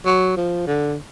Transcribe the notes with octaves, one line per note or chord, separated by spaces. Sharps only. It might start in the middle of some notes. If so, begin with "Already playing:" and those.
F#3
F3
D3